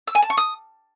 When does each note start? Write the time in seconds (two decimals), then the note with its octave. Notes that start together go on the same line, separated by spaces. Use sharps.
0.07 E6
0.15 G#5
0.22 A5
0.30 C#6
0.37 D#6